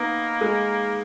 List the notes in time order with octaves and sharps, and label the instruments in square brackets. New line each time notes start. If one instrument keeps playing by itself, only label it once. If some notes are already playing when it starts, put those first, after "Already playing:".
Already playing: [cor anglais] A#3 [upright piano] B3 D#4
[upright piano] G#3